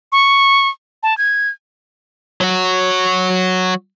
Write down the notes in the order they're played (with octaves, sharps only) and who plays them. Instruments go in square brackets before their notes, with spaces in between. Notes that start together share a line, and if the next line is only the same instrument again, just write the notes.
[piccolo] C#6
A5
G#6
[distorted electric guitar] F#3 F#4